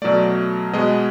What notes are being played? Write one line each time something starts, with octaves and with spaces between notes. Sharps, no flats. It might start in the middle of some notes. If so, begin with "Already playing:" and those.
B2 F#3 A3 D5
B2 G#3 B3 D#5